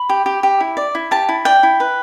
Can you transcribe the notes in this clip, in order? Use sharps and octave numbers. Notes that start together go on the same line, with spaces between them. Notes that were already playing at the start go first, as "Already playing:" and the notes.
Already playing: B5
G4
G4
G4
E4
D5
E4
G4 A5
E4
D5 G5
E4
B4